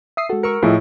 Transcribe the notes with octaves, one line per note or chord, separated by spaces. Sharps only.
E5 D#6 C7
G#3 F#4 A4
A#4 C#6 E6 C#7
A2 F3 E4 F4 G#4 D#5 G5